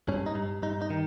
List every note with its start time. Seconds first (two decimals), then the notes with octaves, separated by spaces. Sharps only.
0.08 G2 C#4
0.26 D#4
0.35 G2
0.62 G2 D#4
0.82 D#4
0.90 D#3